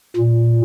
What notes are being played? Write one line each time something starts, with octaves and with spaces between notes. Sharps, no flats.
A#2